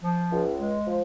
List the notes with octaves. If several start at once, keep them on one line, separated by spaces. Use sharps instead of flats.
F3
C#2
G#3
F3